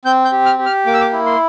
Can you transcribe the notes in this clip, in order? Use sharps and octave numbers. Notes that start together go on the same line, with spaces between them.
C4 G6
G6
G4
F6
G4
F6
A#3 D6
E6
D6
E4
C6